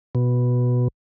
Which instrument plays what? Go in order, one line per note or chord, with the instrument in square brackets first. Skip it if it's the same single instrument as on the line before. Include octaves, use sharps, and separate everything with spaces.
[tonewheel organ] B2